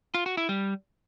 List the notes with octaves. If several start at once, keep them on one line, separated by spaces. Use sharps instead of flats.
F4
F#4
E4
G3